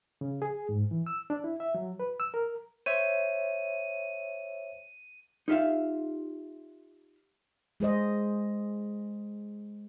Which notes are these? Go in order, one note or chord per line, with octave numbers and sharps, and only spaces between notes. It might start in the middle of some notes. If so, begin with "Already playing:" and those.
C#3
G#4
G#2
E3
E6
D4
E4
E5
F#3
B4
E6
A#4
C5 C#5 E5 D#7
D#4 F4 G4 E5 F5
G#3 G#4 C5 D#5